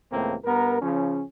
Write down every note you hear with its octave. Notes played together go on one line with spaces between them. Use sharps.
C#2 A2 E3 A#3 C4
G2 B3 A#4
C#3 F3 C#4